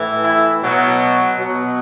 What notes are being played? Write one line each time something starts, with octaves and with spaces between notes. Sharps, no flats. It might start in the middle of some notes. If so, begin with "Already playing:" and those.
Already playing: A2 E3
E4
B2 F#3
B2 F#3